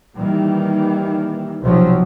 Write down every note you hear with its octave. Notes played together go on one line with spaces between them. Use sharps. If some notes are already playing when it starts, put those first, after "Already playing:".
D#3 E3 G3 A#3
B1 C3 F3 F#3